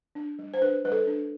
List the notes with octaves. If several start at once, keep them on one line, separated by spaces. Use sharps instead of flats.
D4
G3
C5
D4 B4
G3 B4
A4
D4